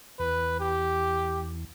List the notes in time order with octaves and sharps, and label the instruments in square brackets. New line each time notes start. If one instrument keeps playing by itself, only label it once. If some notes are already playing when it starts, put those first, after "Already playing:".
[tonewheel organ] E2 [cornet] B4
[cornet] G4